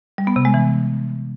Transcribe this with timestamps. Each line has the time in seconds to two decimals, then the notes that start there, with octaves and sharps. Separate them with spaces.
0.18 G3
0.27 B3
0.36 C3
0.45 G#3
0.54 E3